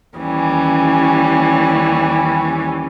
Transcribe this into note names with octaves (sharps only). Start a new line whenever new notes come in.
D#2 E3 G3 C#4